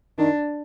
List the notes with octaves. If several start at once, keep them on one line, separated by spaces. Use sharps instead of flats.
D#3 D4